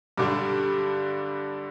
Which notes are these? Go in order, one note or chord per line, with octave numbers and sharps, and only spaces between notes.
G2 D3 G3 D4 D6